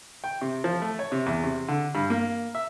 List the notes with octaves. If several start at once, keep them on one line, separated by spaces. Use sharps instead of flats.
G5
C3
F3
A3
C#5
C3
E2
C3
D3
G2
A#3
E5